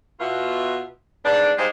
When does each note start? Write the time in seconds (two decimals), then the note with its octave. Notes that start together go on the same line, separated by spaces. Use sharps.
0.19 B2 F4 E5
1.24 G#2 G3 B3 D4
1.57 G3 G#3 D#4 G4 C5 F5